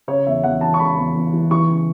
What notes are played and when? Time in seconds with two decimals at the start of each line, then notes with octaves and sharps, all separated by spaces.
0.08 C#3 C#5
0.26 E2 E5
0.44 E2 F#5
0.61 E3 A5
0.74 C#6
0.79 C#3 B5
0.98 E2
1.15 E2
1.33 E3
1.51 E3 C#6
1.69 C#3